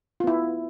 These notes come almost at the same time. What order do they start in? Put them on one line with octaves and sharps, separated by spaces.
F4 B3 E4